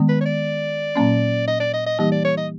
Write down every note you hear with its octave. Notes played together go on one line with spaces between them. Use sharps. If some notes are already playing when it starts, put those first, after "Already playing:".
Already playing: D#3 G#3 B3
B4
C#5
D5
A#2 F#3 A#3 C#4
D#5
D5
D#5
D#5
E3 G3 A#3 D#4 G4 D#5
D5
C#5
D#5